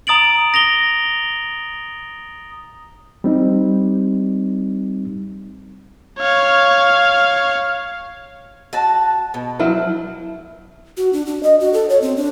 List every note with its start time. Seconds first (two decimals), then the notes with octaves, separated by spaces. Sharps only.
0.07 A#5 D#6 A6 D7 F#7
0.54 A#6 F7 G7
3.24 G3 C4 D#4
6.19 C#5 F5
8.73 F#4 A5
9.34 B2
9.59 F3 F#3 E4
10.97 F#4
11.13 D4
11.26 D4
11.43 D#5
11.60 F#4
11.73 A4
11.89 C#5
12.02 C4
12.17 D4